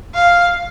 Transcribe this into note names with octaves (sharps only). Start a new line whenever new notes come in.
F5